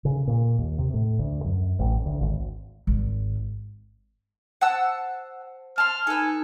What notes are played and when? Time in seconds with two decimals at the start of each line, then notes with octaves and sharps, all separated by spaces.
0.05 C#3
0.27 A#2
0.58 D#2
0.78 C3
0.94 A2
1.19 D2
1.44 F#2
1.79 A1
2.06 D2
2.21 G#1
2.87 G#1
4.61 C5 F#5 A5 E6
5.78 A5 C6 F6
6.07 D#4 A4 B4 G#5 A5